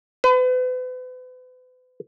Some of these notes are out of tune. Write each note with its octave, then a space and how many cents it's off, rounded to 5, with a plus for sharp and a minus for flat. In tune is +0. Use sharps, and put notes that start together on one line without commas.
B4 +40